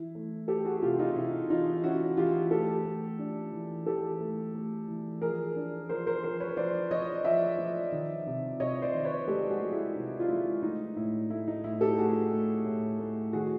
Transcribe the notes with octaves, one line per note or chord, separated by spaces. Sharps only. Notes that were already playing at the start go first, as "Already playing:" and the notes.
Already playing: E3 E4
A3
A3 G4 A4
F#4 G#4
C3 F4 G4
D#4 F4
C3 E4
E3 D#4 F4
C#4 E4 F#4
E3 F4 G4
A3 G4 A4
A3
D4
E3
E3 G4 A4
A3
A3
E3
F3 G#4 A#4
D4
F3 A#4 C5
A#4 C5
F3 A#4 C5
B4 C#5
F3 C5 D5
F3 C#5 D#5
F3 D5 E5
F3
D#3
C3
C3 C#5 D#5
C5 D5
D#3
B4 C#5
G#3 G4 A4
F#4 G#4
G#3
E4
C3 D#4
F4
G#3 E4
A3 D#4
A2 E4
A3 E4
D#4
A2 E4
G4 A4
A3 F#4 G#4
A3
A2
A3
D#3 F#4 G#4